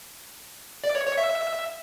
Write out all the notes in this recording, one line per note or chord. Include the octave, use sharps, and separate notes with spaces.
D5
C#5
C#5
E5